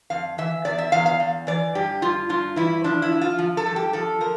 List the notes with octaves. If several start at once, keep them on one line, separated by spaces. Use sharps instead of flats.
F2 F5
E3 E5
E2 D5
E5
E2 F5
F5
E2
E3 D5
G2 G4
G2 F4
G2 F4
E3 E4
F3 D4
E4
F3
F4
F3
A4
G2
G4
F3 A4
F3 A#4